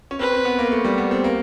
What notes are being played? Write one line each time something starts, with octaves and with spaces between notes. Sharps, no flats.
C#4
C4 B4
C4
B3
A#3
A3
G3
B3
C4
A#3